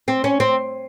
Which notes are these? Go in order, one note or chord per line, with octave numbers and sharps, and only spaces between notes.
C4
C#4
C4